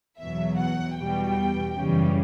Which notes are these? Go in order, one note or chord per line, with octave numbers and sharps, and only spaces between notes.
E2 B2 F#3 E5
F#5
E2 B2 G3 G5
F#2 C#3 E3 G3